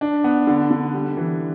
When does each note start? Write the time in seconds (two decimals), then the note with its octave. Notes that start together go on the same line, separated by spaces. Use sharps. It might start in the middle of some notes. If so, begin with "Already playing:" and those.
0.01 D4
0.24 B3
0.47 D3
0.71 D3
0.93 G3
1.17 E3